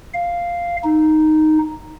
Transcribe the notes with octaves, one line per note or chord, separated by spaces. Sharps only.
F5
D#4